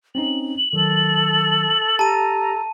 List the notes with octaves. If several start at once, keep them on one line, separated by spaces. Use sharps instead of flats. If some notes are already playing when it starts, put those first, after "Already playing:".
C4 C#4 D#4 F#7
D#3 F#3 A4
G4 A5 A#5 D#7